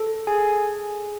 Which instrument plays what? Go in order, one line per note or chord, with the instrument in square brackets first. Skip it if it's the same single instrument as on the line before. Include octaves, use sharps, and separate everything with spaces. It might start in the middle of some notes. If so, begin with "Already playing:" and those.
Already playing: [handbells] A4
G#4 G#5